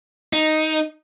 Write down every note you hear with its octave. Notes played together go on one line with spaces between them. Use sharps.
D#4